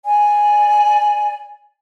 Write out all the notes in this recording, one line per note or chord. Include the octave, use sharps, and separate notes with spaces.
D5 G#5